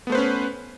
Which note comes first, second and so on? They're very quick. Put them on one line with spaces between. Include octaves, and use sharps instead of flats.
B3 A3 C5 B4 C#4